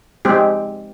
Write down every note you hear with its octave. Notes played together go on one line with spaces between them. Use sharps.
G#3 C4 G4